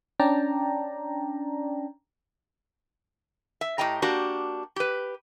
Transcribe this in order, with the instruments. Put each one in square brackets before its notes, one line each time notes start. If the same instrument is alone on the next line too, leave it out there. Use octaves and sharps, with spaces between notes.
[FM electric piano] C#4 D4 D5 G5 A5 A#5
[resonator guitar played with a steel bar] E5
A2 G4 D#5 G5 A#5
A#3 D4 F#4 G4
G4 B4